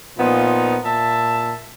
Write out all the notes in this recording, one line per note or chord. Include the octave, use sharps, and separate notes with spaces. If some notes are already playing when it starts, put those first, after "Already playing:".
A#2 F3 B3 D#4
A#2 E5 A5